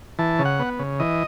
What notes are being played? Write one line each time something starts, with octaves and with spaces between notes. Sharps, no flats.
E3 A5
C#3
F#5
B3
C#3
E3 D#5